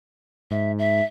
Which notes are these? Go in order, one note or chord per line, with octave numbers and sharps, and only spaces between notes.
G#2 E5
E5